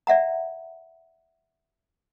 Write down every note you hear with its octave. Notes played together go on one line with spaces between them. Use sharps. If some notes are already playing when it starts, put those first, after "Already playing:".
D5 E5 F#5 A#5